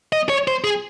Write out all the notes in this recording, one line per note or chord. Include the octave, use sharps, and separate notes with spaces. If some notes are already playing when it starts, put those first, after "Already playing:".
D#5
C#5
C5
G#4